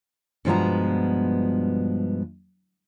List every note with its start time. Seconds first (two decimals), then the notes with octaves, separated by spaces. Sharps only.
0.45 G2 B2 F3 G#3 B3 A#5